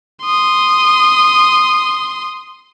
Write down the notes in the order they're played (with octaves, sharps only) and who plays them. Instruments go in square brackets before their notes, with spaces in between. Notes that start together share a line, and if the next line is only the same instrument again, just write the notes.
[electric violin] C6 D#6